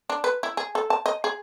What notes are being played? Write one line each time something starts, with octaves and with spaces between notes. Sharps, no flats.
D4
B4
E4
G#4
A4
A5
D#5
G#4